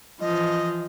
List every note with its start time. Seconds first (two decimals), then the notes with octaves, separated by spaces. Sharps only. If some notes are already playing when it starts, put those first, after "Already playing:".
0.20 E3 F3 D#5